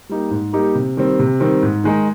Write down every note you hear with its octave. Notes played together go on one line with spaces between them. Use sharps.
G3 A#3 D#4 G4
G#2
G3 A#3 D#4 G4
C3
D#3 G3 C4
C3
D#3 G3 C4
G#2
D#3 G#3 D#4